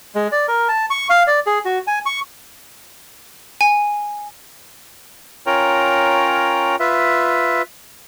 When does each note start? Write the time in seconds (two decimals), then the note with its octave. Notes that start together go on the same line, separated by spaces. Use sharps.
0.15 G#3
0.32 D5
0.48 A#4
0.68 A5
0.90 C#6
1.10 F5
1.27 D5
1.46 G#4
1.65 F#4
1.87 G#5
2.06 C#6
3.61 G#5
5.46 C#4 F4 A#4 C#5 G5 A#5
6.80 F4 B4 E5